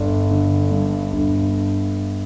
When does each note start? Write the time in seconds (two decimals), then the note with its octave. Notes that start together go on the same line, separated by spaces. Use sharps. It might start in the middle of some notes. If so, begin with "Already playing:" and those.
Already playing: G1 D5
0.31 D3
0.71 G2
1.13 G1